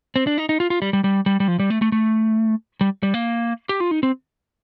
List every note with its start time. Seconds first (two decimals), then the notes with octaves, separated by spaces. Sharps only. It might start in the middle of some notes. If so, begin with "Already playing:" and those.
0.16 C4
0.27 D4
0.38 D#4
0.49 D#4
0.60 F4
0.70 F4
0.82 G3
0.93 G3
1.04 G3
1.26 G3
1.40 G3
1.48 F3
1.60 G3
1.70 A3
1.82 A3
1.92 A3
2.81 G3
3.03 G3
3.14 A#3
3.69 G4
3.80 F4
3.91 D#4
4.03 C4